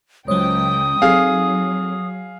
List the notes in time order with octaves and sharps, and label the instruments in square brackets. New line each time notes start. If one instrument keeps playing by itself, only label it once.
[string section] C#2 G5 [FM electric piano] F#3 C5 C#5 [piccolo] D#6
[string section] F#3 [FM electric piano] C4 D#4 A4 [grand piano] G#4 F5